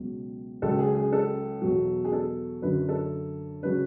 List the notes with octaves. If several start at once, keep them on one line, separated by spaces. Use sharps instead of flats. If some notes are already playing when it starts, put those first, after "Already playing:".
Already playing: C#2 B2 F#3
C#2 C#3 F#3 A4
G#4
G#4
A4
E2 B2 F#3
G#4
A4
F#2 D3 F#3 B4
A4
C#3 F#3 B4